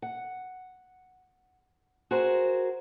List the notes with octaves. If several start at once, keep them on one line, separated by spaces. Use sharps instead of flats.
F#5
F#4 G#4 A#4 C5